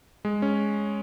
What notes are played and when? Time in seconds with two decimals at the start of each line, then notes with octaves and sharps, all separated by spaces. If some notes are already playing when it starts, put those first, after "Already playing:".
0.25 G#3
0.42 C#4